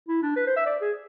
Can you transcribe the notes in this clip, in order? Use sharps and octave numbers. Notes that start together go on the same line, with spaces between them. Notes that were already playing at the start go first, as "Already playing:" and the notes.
E4
D4
B4
C5
E5
D5
G#4